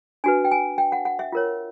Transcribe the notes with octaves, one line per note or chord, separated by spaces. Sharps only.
D4 F#4 B4 G#5
G5
G#5
G5
F#5
F#5
E5
F4 A#4 C#5